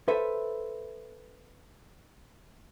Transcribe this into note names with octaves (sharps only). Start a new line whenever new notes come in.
A4 B4 C5 E5